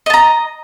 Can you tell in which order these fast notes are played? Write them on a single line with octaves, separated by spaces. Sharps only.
D#5 A5 A#5